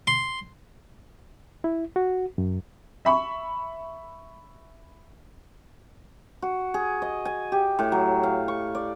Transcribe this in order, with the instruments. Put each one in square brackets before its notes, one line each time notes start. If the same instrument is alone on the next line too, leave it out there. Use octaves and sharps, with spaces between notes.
[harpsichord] C6
[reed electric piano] E4
F#4
F#2
[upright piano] E5 B5 C#6
[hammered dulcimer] F#4
G#4
D#5
G#5
G4
A2
F#3
F5
C#6
D5